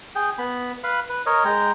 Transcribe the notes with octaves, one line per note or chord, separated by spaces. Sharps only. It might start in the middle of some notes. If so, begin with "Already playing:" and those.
G#4 G5
B3 B5
B4 F5 B5
B4
A#4 C#5 D#5
G#3 G5 A#5